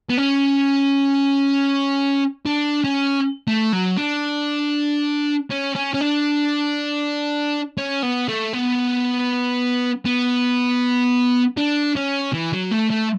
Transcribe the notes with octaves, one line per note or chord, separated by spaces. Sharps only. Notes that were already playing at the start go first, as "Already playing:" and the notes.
B3
C#4
D4
C#4
A3
F#3
D4
C#4
C#4
C#4
D4
C#4
B3
A3
B3
B3
D4
C#4
E3
F#3
A3
A3